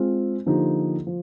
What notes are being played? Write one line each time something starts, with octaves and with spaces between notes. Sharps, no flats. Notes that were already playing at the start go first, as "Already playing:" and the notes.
Already playing: G#3 C4 F4
D3 F3 A#3 D#4 G4
F3